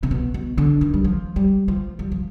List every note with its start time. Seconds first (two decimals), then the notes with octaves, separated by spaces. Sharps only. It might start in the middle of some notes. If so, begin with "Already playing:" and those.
0.03 C3
0.11 B2
0.34 B2
0.58 D3
0.81 D#3
0.94 G3
1.05 F3
1.36 G3
1.68 F3
1.99 G3
2.12 F3